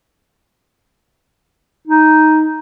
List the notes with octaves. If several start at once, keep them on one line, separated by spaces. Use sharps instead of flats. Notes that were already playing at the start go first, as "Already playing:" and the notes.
D#4